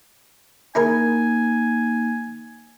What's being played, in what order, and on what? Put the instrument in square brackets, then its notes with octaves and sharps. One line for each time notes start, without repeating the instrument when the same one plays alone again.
[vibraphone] A#3 D#4 [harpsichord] E4 G#4 A#4 [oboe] G#5